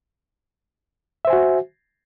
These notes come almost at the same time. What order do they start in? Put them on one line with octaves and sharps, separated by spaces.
E5 C5 G#5 F#4